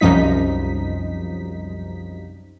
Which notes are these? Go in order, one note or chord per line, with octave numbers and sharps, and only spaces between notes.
C2 F#2 F3 G3 D#4 B6